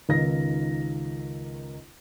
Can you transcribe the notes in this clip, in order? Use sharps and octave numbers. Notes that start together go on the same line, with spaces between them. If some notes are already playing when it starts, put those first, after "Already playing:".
C#2 D#3 D#4 A#6